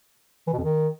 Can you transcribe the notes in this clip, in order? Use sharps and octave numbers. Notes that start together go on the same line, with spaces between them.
E3
B2
F2
D#3